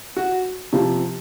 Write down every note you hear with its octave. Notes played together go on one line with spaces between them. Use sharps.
F#4
C3 F3